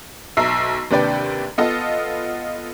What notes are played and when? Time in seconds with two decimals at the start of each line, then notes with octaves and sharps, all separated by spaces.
0.37 B1 E5 A#5 E6 C7
0.91 D#2 C3 D4 B4 D5 G5
1.58 B3 F4 A4 D#5